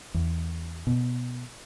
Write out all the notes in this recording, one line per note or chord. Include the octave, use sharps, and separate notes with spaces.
E2
B2